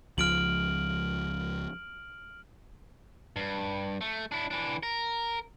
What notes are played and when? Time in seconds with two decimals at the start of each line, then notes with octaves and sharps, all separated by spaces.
0.18 C#2 F3 F6 D7 F#7
3.36 G2
4.01 A3
4.32 D4 E4
4.51 E3 D4
4.83 A#4